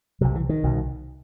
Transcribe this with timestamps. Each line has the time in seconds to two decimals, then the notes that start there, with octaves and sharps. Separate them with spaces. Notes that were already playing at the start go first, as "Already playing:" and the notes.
0.21 C2 C3 F#3
0.35 E3
0.49 D#3
0.64 C2 B2